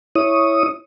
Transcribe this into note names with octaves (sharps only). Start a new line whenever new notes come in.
E4 C#5 D#6